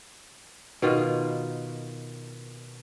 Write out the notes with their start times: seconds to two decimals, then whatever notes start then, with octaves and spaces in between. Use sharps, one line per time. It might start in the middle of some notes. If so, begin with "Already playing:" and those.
0.82 B2 D#3 F4